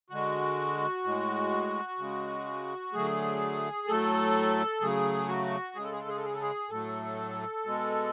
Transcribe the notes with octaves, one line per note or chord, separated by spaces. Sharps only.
D3 G#3 F#4
A2 G#3
C#3 G#3
D3 F#3 A3 G#4
A2 F#3 A3 A4
C#3 F#3 A3 G#4
F#4
C#3 G#3 G#4
A4
G#4
A4
G#4
A4
G#4
A4
G#4
A2 F#3 A3 A4
B2 G#3